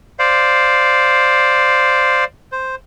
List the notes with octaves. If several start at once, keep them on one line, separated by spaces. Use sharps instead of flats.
C5 D5 F5
C5